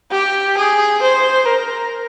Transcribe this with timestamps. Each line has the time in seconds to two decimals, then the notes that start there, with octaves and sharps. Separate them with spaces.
0.12 G4
0.57 G#4
1.02 C5
1.45 A#4